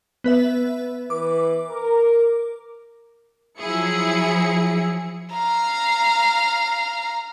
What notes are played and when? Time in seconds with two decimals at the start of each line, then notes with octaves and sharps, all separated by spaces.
0.24 B3 B4 E5
1.10 E3 B4 D6
1.69 A#4
3.58 F3 F#3 E4 G#4 C#7
5.32 F5 A#5